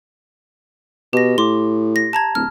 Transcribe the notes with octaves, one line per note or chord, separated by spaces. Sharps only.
B2 G4 A#6
A2 C6 D6
A#6
A5 A#5 G#6
D1 F6